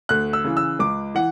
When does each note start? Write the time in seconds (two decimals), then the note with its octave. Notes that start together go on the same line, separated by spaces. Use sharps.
0.09 D2 F#6
0.33 E6
0.44 C#3 E3
0.57 E6
0.79 C#2 D6
1.15 E3 F#5